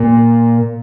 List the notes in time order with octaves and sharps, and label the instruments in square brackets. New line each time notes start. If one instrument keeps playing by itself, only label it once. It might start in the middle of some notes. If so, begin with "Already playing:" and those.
Already playing: [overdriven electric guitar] A#2